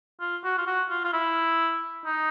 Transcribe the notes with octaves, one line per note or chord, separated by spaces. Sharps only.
F4
F#4
F4
F#4
F4
F4
E4
D#4